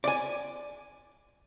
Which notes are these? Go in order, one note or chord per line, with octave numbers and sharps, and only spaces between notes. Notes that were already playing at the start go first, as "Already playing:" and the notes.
D5 G#5